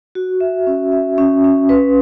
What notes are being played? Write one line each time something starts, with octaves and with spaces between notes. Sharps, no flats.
F#4
E5
C#4
E5
C#4
C#4
B4